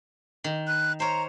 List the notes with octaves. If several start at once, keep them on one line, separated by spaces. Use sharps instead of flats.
D#3
F#6
C5 C#5 A#5